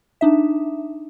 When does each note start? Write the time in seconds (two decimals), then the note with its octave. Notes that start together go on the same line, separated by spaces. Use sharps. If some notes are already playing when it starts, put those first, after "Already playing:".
0.21 D4 D#4 E5